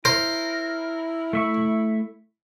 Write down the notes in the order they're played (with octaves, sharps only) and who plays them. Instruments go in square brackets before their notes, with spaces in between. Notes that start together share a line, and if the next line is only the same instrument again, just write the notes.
[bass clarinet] E4 [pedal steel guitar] A#4 [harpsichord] C5
[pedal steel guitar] A3 E5 C#6